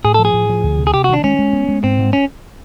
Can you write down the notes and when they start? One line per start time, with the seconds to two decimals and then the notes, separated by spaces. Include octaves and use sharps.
0.04 A2 G#4
0.14 A4
0.19 F3
0.25 G#4
0.34 A2
0.49 F3
0.64 D2
0.79 C3
0.87 G#4
0.94 C3 G4
1.04 F#4
1.09 D#3 D4
1.24 G#3 C#4
1.39 G#3
1.53 B3
1.69 G#3
1.83 G#2 C4
1.99 G#2
2.13 C#4